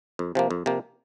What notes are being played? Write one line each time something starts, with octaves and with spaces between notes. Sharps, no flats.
F2
C3 F3 A#3
F2
C3 F3 A#3